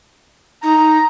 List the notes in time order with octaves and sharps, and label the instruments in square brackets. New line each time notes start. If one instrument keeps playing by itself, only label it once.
[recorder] D#4 [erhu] A#5